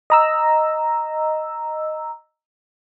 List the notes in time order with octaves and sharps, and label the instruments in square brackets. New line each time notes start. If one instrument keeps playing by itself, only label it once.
[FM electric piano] D#5 A#5 E6